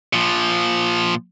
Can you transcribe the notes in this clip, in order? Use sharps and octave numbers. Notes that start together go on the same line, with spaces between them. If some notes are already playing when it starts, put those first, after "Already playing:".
A#2 F3